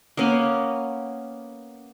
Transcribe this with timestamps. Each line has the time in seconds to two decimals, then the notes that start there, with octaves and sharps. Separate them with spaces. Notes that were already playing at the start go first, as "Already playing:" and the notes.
0.17 A#3 B3 C#4